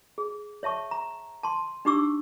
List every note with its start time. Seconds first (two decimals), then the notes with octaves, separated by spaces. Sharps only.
0.18 G#4
0.63 C#5 E5 A5 C#6
0.91 A#5
1.43 A5 C6
1.85 D4 D#4 G4 C#6 D6 E6